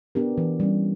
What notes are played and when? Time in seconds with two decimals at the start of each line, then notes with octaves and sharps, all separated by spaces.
0.15 B3 D4 G4 A#4
0.38 E3
0.60 G3 C#4